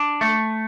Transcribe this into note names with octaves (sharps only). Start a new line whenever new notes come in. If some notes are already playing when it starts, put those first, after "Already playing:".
Already playing: D4
A3